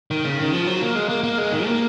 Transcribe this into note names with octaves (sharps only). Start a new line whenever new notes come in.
D#3
C#3
D#3
F3
F#3
A#3
G#3
A#3
A#3
G#3
D#3
A#3